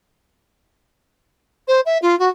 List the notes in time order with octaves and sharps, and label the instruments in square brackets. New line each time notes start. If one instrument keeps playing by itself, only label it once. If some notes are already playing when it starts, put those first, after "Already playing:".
[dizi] C5
E5
F4
F#4